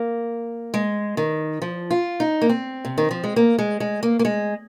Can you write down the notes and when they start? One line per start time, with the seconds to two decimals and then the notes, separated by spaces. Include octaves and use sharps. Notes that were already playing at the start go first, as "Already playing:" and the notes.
Already playing: A#3
0.74 G#3
1.17 D#3
1.62 F3
1.91 F4
2.20 D#4
2.42 A#3
2.49 C4
2.85 C3
2.98 D#3
3.11 F3
3.24 G#3
3.36 A#3
3.59 G#3
3.80 G#3
4.03 A#3
4.19 A#3
4.25 G#3